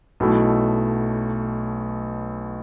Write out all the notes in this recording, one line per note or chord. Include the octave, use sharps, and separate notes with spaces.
B1 B2 F#3 A3 E4